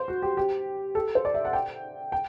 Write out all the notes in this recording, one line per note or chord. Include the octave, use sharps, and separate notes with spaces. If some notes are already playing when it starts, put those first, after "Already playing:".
Already playing: C5
F#4
G4
G4
A4
C5
D5
E5
F#5
G5
G5